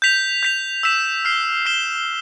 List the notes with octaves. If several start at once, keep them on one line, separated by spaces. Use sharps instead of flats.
G6 B6 F7
G6 B6 F7
E6 B6 E7
F6 C7 G7
F6 C7 E7 G7